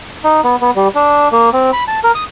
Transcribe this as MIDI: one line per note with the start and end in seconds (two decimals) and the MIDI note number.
0.24 0.41 63
0.44 0.56 59
0.61 0.71 59
0.76 0.88 55
0.95 1.28 62
1.32 1.50 58
1.53 1.70 60
1.73 1.84 83
1.88 2.00 81
2.04 2.11 70
2.15 2.24 87